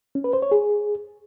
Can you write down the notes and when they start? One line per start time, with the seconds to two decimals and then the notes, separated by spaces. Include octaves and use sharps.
0.15 C#4
0.24 B4
0.33 C5
0.42 C#5
0.52 G#4